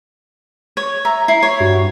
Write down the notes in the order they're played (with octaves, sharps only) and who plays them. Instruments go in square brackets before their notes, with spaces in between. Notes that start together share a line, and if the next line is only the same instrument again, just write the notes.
[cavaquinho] C#5
[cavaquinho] E5 [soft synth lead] A#5
[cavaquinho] E4 [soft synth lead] C7
[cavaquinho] C#5
[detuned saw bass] G2 [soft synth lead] F#4